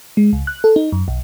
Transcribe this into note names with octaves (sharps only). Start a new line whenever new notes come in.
G#3
C#2
F#6
A4
D#4
F#2
B1